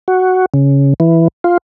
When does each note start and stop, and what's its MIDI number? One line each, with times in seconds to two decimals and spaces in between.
0.08 0.46 66
0.54 0.94 49
1.00 1.28 52
1.44 1.57 65